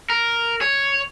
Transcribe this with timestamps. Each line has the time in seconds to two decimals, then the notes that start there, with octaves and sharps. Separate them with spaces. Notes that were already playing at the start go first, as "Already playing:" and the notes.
0.10 A#4
0.61 C#5